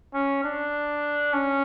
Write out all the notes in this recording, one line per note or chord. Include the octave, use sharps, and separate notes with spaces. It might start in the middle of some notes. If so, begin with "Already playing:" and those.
C#4
D4
C#4